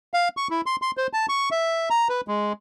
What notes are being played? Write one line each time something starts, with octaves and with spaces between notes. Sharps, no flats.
F5
C#6
E4
C6
C6
C5
A5
C#6
E5
A#5
B4
G#3